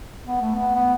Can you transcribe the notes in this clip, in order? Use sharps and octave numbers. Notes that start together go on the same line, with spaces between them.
B3
A3
B3
B3